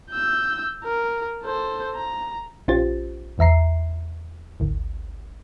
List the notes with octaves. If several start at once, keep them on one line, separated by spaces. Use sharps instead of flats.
E6 G6
A#4
A4 C5
A#5
A#1 C#4 F4 G4 C5 A6
A1 E2 E5 A#5 C7
G#1 D2